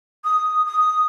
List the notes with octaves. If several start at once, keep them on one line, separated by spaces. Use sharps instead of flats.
D#6
D#6